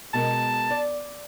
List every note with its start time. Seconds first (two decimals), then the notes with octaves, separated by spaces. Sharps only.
0.14 B2 G#3 A#4 A5
0.71 D5